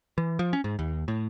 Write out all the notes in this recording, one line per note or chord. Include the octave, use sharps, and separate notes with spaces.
E3
F3
C#4
G#2
D#2
A2